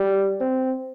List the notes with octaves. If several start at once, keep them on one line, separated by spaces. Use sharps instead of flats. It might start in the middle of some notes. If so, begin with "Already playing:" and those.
Already playing: G3
C4